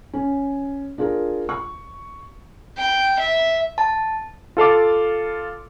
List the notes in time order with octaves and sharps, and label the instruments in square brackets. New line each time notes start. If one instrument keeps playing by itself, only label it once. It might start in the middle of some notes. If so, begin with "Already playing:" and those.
[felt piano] C#4
D4 F4 G#4 A#4
C#6
[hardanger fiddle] G5
E5
[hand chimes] A5
[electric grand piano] F4 A4 F5 D6